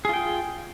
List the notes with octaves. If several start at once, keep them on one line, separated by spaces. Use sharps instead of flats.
F4 G#4 G5